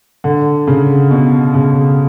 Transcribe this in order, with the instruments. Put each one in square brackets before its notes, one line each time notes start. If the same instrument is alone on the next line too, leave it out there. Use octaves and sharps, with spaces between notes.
[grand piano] D3
C#3
B2
C#3